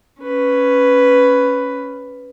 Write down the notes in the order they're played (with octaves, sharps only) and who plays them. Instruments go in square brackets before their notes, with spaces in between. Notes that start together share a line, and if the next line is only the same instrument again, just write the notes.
[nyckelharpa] C#4 B4